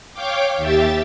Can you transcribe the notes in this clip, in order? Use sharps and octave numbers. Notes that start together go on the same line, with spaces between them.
C#5 F5 G5 D6
D#2 G4 E5 A6